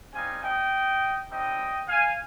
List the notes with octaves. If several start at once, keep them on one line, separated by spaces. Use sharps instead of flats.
G3 C4 D#4 F5 G#5
D#5 G5
G3 C4 D#4 D#5 G5
F5 G#5